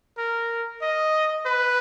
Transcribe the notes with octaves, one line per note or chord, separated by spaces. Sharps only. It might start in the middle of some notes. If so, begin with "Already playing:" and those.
A#4
D#5
B4